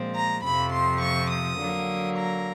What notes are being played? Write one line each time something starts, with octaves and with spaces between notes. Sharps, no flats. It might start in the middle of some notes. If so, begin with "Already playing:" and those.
Already playing: A#2 F3 G#3 C4
A#5
F2 C3 F3 B5
C6
C#6
D#6
D3 F#3 A#3
A#5